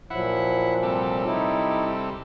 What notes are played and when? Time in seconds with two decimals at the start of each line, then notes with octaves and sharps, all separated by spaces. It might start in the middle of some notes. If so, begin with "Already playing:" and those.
0.10 A#2 F3 F#3 E4 F#5
0.83 C3 G3 A4
1.25 D#4 E4